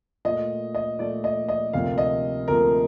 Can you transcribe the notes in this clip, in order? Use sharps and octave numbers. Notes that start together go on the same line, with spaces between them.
A#2 A3 D#5
D#5
A#2 A3 D5
D#5
D#5
D2 C3 F3 A#3 F5
D#5
D2 C3 F3 A#3 A#4